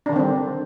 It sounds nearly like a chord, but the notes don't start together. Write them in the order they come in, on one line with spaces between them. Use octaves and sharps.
D4 D#3 D3 C4 G3